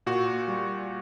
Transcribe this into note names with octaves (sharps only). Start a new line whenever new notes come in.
A#2 F#4
G3